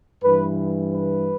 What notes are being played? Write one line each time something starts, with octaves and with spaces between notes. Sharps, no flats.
G2 E3 B4
B4